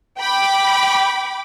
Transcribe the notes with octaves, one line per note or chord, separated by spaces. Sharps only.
G5 B5 D6